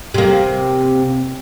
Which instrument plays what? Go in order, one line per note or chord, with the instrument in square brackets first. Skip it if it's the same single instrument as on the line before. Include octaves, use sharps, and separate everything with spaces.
[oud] C3 A#3